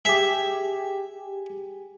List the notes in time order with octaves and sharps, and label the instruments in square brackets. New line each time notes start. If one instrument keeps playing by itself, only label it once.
[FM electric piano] G4 G#4 G#5 [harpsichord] E5